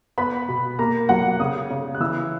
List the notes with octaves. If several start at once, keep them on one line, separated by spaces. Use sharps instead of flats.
B3 B5
B2
A#3 A#5
F#3 F#5
C#3 D#6
C#3
F#6
E3 E6